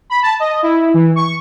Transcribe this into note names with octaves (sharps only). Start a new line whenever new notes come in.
B5
A5
D#5
E4
E3
C#6